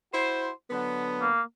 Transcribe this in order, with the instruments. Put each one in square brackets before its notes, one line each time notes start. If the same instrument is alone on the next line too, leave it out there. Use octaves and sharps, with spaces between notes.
[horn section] E4 F#4 C5
D3 F#3 B3
[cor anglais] A#3